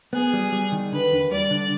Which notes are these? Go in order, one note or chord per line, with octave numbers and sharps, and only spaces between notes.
B3 G#4
G3
G3
D#3
D3 B4
D#2
G3 D5
D3